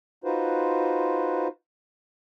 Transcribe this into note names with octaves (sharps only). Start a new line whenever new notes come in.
D#4 F4 F#4 B4 C5